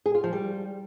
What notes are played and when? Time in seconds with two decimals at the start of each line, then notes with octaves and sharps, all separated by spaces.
0.06 G#4
0.15 F4
0.24 F3
0.33 G3